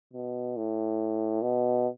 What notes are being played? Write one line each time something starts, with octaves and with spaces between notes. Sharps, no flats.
B2
A2
B2